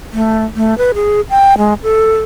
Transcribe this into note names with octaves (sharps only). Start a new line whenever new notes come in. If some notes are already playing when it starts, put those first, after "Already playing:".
A3
A3
B4
G#4
G5
G#3
A4